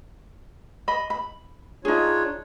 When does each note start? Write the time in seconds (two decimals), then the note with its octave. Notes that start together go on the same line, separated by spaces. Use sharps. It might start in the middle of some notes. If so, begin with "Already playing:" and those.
0.88 D#5 B5
1.10 B5
1.85 D4 D#4 F4 G#4 C#5